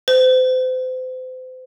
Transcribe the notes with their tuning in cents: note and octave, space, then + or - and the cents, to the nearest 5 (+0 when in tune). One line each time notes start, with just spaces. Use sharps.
C5 -35